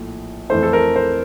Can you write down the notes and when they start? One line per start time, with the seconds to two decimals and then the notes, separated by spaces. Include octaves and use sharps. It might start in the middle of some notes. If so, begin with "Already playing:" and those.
Already playing: A#1 A2
0.50 F2 E3 A3 C5
0.63 A4
0.73 A#4
0.96 C5